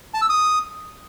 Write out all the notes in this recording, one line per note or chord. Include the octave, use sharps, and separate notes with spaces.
A5
E6
D#6